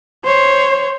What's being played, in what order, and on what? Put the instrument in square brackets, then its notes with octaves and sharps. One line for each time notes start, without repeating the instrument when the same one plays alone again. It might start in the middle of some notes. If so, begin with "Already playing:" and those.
[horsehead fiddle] C5 C#5